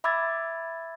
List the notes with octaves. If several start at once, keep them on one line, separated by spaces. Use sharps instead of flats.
E5 B5 D6 E6 G#6 A6